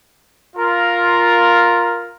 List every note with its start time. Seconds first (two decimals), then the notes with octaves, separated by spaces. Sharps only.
0.56 F4 A#4